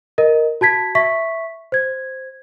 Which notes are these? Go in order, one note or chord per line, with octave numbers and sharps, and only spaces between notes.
A#4 D#5
F#4 A5 G#6 B6
E5 C#6 B6
C5 G#6